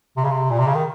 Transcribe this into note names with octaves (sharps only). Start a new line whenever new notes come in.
C3
C#3
C3
A#2
C3
C#3
D#3